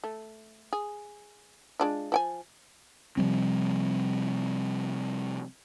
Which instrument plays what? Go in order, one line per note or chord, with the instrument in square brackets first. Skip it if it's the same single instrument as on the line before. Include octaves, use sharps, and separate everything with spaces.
[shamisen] A3
G#4
G#3 D4 F4
F3 G5 G#5
[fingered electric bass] C3 F3 G3 C4